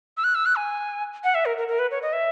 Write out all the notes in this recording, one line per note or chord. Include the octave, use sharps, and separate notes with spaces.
E6
F#6
E6
F#6
G#5
F#5
E5
A#4
A#4
A#4
B4
C#5
D#5
E5